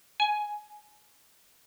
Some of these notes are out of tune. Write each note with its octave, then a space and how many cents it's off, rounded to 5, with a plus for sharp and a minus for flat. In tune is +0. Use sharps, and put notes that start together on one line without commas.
G#5 +10